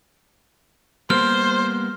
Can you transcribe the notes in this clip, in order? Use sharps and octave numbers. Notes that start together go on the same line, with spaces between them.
G3 A#3 B3 C5 F6